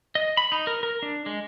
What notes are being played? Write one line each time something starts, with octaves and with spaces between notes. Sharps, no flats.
D#5
B5
D#4
A#4
A#4
D4
G#3